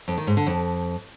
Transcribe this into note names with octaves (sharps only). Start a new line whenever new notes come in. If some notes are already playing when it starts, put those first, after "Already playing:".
F2
D#3
G#2
D3
F2